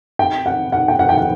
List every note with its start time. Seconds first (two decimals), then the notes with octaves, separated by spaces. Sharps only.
0.19 G5
0.46 F#5
0.72 F#5
0.88 G5
0.99 F#5
1.09 G5
1.18 F#5